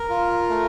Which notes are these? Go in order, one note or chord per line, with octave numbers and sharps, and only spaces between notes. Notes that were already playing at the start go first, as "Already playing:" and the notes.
Already playing: A#4
F4
A3